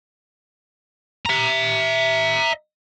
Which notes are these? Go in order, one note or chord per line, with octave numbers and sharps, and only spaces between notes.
E5 A#5